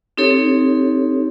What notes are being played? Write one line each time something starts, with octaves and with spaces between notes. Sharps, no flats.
C4 D#4 G4 A4 C#5